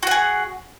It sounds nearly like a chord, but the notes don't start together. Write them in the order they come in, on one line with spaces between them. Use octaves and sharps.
F#4 F#5 G#4